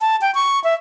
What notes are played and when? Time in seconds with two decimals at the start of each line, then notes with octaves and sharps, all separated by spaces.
0.01 A5
0.21 G5
0.35 C#6
0.64 E5